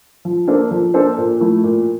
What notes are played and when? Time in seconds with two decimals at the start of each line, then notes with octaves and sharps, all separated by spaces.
0.25 F3
0.48 A#3 D4 A4 C5
0.71 F3
0.94 A#3 D4 A4 C5
1.18 A#2
1.40 F3 A3 E4
1.64 A#2